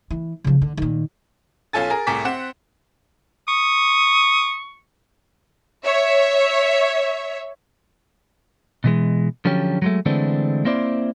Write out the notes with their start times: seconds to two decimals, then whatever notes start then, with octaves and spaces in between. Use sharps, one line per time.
0.11 E3
0.44 C#3 F3
0.62 D3
0.77 A#2 D#3
1.73 B1 C#4 F4 A4 G#5 A6
1.90 G#4 A#4
2.07 C2 A2 G#4 A#4 D6 B6
2.25 C4 F#5 E7
3.48 C#6 D#6
5.84 C#5 E5
8.84 B2 E3 G#3
9.45 D3 F3 F#3 C#4 G4
9.82 F#3 G#3 A3
10.06 D3 E3 G#3 A3 C4 D4
10.65 A#3 C4 E4 C5 D5